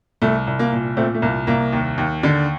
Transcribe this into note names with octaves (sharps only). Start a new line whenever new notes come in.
C2 A3
C2
A#3
A#2
A#2 A3 C4
A3
C2 A#3
C2 A#3
D#2
D#2
D3